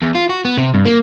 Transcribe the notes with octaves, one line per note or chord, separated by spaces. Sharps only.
E2
F4
F#4
B3
C3
G2
A#3